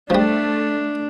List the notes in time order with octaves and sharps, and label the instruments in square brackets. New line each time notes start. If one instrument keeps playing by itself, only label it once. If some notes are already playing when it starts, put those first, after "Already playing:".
[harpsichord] F3 G3 [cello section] A3 [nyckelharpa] D4